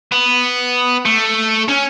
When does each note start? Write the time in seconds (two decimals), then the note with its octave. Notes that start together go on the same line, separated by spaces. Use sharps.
0.12 B3
1.06 A3
1.68 C#4